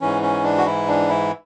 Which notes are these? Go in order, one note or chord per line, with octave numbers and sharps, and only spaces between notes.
G#2 E3 C#4
C#4
D4
F#4
E4
D4
E4